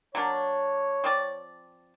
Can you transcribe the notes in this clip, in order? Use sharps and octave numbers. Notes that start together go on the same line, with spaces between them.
F#3 A#3 D4 C#5
F3 C4 D5